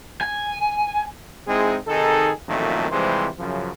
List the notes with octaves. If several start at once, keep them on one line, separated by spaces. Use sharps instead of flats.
G#5
G#3 C4 D#4 E4 G#4
C3 D#3 D#4 G#4 A4
A1 F2 A#2 D#3 F#3 A3
C3 E3 F3 G3 G#3 C5
F#2 C#3 F3